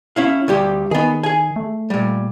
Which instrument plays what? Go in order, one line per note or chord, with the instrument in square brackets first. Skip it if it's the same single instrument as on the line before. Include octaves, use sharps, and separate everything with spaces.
[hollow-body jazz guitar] C#4 E4 F5
D2 G3 G4
[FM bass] D#3 [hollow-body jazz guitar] B3 G#4
[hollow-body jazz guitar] G#4 G#5
[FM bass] A3
[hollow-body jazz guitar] A#2 G3